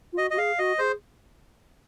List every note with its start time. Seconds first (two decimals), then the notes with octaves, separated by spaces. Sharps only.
0.13 F4
0.18 F#4 D#5
0.31 F#4 D#5
0.38 G#4 F5
0.58 F#4 D#5
0.78 G#4 C5